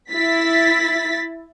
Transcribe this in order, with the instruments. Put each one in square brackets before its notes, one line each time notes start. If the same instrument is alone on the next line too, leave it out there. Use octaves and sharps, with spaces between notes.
[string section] E4 A6 B6